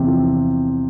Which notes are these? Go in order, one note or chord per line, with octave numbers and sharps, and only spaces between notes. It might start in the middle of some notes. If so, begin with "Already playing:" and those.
Already playing: E2 C3
F3